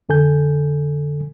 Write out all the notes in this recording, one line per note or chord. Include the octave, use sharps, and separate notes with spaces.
F2 D3 A4 G#5 G6